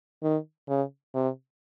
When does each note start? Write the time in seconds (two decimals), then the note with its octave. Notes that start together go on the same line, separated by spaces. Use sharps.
0.23 D#3
0.68 C#3
1.14 C3